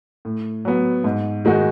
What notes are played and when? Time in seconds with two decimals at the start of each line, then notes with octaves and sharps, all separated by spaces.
0.25 A2
0.65 F#3 B3
1.04 G#2
1.45 D#3 G#3 D#4 F#4